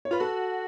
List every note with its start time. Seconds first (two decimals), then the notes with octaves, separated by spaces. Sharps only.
0.05 C#5
0.11 F4 B4
0.20 F#4 A4